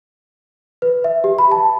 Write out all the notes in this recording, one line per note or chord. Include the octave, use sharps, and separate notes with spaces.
B4
E5
G4
B5
A5